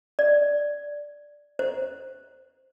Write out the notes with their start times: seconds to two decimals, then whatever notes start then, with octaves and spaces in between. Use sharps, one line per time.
0.19 D5
1.59 C5